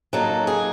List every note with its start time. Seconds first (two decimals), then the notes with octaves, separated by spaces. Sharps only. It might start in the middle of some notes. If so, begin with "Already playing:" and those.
0.13 F#3 A#3 D#4 A4
0.47 G#4